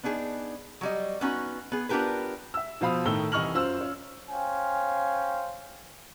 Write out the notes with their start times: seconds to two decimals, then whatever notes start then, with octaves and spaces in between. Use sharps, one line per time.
0.03 B3 D4 D#4 G#4
0.81 F#3 G3 D#5
1.21 B3 C#4 D#4 F#4
1.72 B3 G#4
1.89 B3 D4 F4 G4 A#4 B4
2.54 E5 E6
2.81 B2 F3 C5 F5 B5 D#6
3.06 A2 D#3 A3 A4 E6 G7
3.32 C2 E3 D#5 C#6 F6 F#7
3.54 F#2 F4 C5 E6
3.81 C#4 F4
4.29 C#4 C5 F5 G5 G#5